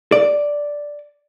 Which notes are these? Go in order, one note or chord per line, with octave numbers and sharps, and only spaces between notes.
D5